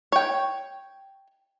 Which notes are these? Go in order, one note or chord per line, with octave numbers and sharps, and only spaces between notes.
C#5 G5